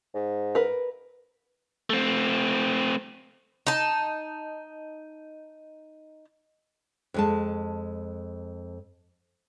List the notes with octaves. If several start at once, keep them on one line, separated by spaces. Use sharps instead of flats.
G#2
A#4 B4
A3 C4
D#4 A5
F2 G#3 A5